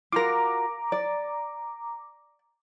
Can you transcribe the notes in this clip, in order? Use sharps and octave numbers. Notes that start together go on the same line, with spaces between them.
F4 F#4 A#4 A#5 D6
D5